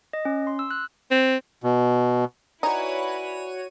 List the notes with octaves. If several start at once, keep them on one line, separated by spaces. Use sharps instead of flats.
D#5
C#4
C6
E6
F#6
C4
B2
D#4 E4 F#4 B4 C#5 D5 G#5 D#7